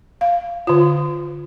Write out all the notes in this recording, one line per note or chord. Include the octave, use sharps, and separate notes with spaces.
F5
D3 F4